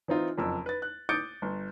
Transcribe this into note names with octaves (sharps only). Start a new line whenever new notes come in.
E3 C4 D#4 F4
F#1 F2 E6
B4 A6
F#6
D6 D#6 G6 A6 C#7 D7
G1